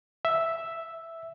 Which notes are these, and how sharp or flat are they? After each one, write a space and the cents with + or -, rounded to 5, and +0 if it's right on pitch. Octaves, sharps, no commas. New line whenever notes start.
E5 +0